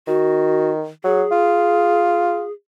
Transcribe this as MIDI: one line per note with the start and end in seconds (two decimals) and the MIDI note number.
0.07 0.88 51
0.07 0.71 66
1.04 1.23 54
1.04 2.51 68
1.31 2.45 65